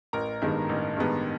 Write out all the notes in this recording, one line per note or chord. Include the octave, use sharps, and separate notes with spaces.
A1 A#4 A#5
G2 D#3 G#3 B3
A1
G2 D#3 G#3 B3